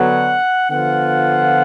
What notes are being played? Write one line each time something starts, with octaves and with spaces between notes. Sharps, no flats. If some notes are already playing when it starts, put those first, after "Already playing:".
Already playing: D3 F#3 B3 F#5
D3 F3 B3 F4 F#5